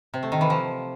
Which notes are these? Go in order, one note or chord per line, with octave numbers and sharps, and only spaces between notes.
C3
A3
D#3
E3
F3